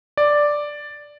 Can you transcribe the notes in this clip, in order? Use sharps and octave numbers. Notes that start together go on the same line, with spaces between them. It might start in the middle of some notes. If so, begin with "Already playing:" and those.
D5